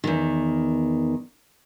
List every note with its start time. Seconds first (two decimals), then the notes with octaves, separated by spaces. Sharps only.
0.04 E2 D#3